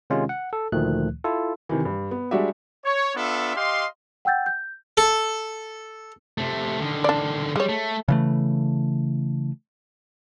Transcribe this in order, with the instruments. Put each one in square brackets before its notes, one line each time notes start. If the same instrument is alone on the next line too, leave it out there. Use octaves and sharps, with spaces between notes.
[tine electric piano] C3 D#3 G#3 C#4 F4
F#5
A4
D2 A#2 D#3 F3 A3 F#6
E4 F4 A4
[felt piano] C3 D#3 E3
G2
B3
G3 G#3 D4 F#4 G4 E5
[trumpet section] C#5
B3 D4 F4 A4 E5
G4 D#5 F5 C6
[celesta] F#5 G5 E6 G6 A6
G6
[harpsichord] A4
[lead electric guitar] C3 A3
D3 D#3
[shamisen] D4 D5
[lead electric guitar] G3 [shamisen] G#3 C#5
[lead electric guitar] A3
[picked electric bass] C#3 E3 A3